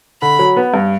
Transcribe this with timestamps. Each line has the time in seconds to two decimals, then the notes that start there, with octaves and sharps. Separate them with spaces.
0.22 D3 B5
0.39 F#3
0.57 B3
0.74 G2